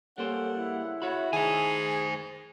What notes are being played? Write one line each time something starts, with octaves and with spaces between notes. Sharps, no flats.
G3 A#3 C#4 A4 C5 F#5
C#3 E4
F#4 C#5 E5 B5
D#3 G#4 C5 D#5 G#5 A5